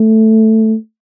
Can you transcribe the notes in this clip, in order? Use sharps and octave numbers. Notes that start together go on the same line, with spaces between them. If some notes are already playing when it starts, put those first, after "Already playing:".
Already playing: A3